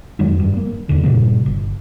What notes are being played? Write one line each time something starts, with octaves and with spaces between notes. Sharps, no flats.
F2 D#3 F#3 G#3
G2
A#3
D1 G1 E2 D3
G2 A#2 C#3 A#3
G1